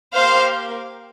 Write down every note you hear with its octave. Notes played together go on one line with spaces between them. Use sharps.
A#3 G4 C5 F5